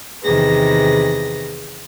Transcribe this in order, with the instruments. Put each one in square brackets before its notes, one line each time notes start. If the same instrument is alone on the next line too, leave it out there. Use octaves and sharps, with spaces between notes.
[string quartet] E2 C3 D#3 G#4 B4 A#6